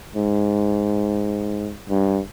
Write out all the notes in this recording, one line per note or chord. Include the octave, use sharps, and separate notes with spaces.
G#2
G2